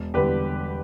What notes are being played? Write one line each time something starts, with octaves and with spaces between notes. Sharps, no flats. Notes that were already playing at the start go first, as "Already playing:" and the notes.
Already playing: E1
E2 D3 G3 G4 B4